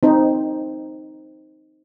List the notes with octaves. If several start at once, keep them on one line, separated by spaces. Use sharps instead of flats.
C4 D#4 C5